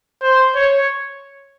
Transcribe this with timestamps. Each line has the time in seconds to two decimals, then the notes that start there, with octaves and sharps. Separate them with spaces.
0.22 C5
0.55 C#5